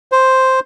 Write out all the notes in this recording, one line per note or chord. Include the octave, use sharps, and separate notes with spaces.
C5